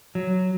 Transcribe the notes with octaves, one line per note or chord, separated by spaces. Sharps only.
F#3